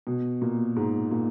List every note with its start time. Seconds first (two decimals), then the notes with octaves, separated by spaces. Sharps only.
0.07 B2
0.42 A#2
0.76 G#2
1.11 A#2